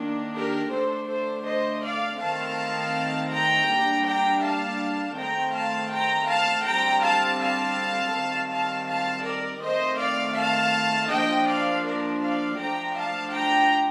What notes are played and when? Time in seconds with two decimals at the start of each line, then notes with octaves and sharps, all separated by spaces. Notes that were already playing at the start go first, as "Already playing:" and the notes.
Already playing: D#3 A#3 D4
0.35 G4 A#4
0.73 D3 A3 D4 A4 C5
1.09 A4 C5
1.47 C5 D#5
1.84 D5 F5
2.21 D#3 A3 C4 F5 A5
3.32 G5 A#5
3.69 G3 A#3 D4
4.06 G5 A#5
4.43 F5 A5
5.17 D#3 A3 C4 G5 A#5
5.54 F5 A5
5.92 G5 A#5
6.29 F5 A5
6.65 D3 G3 C4 G5 A#5
7.03 F5 A5
7.40 F5 A5
8.14 D#3 G3 C4
8.51 F5 A5
8.88 F5 A5
9.25 A#4 D5
9.62 D#3 A3 C4 C5 D#5
9.99 D5 F5
10.37 F5 A5
11.10 F3 A#3 D4 D#5 G5
11.48 D5 F5
11.85 A#4 D5
12.22 D5 F5
12.59 F3 A3 D4 G5 A#5
12.96 F5 A5
13.33 G5 A#5